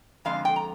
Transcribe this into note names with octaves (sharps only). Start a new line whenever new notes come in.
F2 D3 G#3 F5
G5
A#5